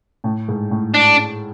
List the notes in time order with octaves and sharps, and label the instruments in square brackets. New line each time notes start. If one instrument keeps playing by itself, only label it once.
[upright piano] A2
G#2
A2
[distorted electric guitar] D4